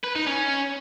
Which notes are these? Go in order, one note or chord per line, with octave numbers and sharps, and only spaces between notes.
B4
D#4
C#4